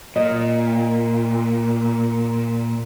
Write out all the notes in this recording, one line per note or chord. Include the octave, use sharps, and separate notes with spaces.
A#2 D#5